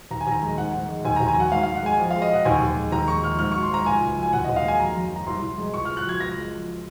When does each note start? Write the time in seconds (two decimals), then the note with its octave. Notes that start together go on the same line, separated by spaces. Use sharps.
0.11 D#2 A#5
0.21 G#5
0.27 D#2 A#5
0.42 G#3
0.58 G#2 F#5
0.74 G#2
0.89 G#3
1.05 D#2 G#5
1.16 D#2 A#5
1.28 G#5
1.36 F#3 F#5
1.52 G#2 F5
1.63 G#2 F5
1.75 F#5
1.83 G#3 G#5
1.98 F2
2.11 G#3 F5
2.22 D#5
2.29 F3 F#5
2.45 D#2 G#5
2.61 D#2
2.76 G#3
2.92 D#2 A#5
3.08 G#3 C#6
3.23 F3 F6
3.39 G#2 F6
3.51 F#3 C#6
3.63 C6
3.71 G#2 A#5
3.86 C#2 G#5
4.02 C#2
4.17 F#3
4.23 G#5
4.33 D#2 F#5
4.44 D#2 D#5
4.56 F5
4.65 G#3 G#5
4.80 F#2 A#5
4.95 F#2
5.11 F#3 A#5
5.27 C2 C6
5.42 C2
5.58 G#3
5.73 C#2 C#6
5.85 C#2 F6
5.97 F#6
6.05 F#3 G#6
6.20 C#2 A#6
6.37 G#3
6.52 F3